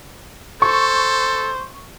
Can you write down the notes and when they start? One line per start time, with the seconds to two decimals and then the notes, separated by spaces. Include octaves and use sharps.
0.62 A4 C5 C#6